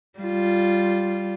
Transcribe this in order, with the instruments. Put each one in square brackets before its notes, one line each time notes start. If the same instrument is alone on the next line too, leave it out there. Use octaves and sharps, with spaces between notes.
[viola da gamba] G3 F4